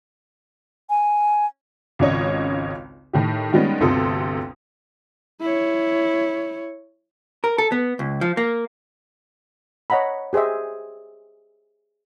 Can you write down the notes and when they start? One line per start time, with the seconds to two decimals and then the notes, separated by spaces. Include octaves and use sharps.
0.90 G#5
1.99 G#1 C#2 C#3 C#5 D#5
3.13 A2 D#3 G4
3.53 D#3 G3 G#3 B3 C#4
3.80 G1 D2 C3 A4 C6 D#6
5.41 E4 C#5
7.44 A#4
7.58 A4
7.72 B3
7.99 C#2
8.21 F3
8.37 A#3
9.90 C#5 D#5 F#5 A#5 B5
10.33 G4 G#4 C5 D#5 E5